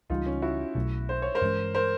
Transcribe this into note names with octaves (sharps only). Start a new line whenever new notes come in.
C#2 C#3 E3 G3 D#4 F4
C#4
E4 F#4
B1 B2 F#3 A3
C5
C#5
A#4 C5
G2 E3 G#3 C#4
A#4 C5